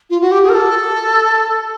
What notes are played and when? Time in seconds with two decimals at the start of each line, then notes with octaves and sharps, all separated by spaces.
0.10 F4
0.21 F#4
0.31 G4
0.43 G#4
0.49 A#4
0.54 A4